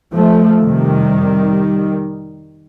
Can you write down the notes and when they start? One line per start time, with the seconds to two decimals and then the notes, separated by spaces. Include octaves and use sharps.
0.14 F3 A3
0.61 F2 C3 D#3 G3